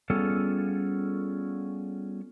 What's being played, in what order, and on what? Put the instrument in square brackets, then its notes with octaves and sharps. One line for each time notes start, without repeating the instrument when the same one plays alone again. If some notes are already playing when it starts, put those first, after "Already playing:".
[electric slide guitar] G3 B3 C#4 F4 G#4 A4